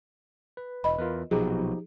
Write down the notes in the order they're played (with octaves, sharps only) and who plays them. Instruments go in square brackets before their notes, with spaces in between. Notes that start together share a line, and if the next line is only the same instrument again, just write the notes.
[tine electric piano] B4
[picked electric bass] E1 [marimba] D#5 B5
[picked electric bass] E2 [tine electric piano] F4 A#4 B4
[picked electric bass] A#1 B2 F#3 [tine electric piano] F3 D#4 G4 [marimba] G#4